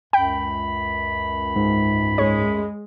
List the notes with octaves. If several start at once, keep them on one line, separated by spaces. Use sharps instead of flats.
C#2 F#2 G5 B5
G#2
G#3 C#5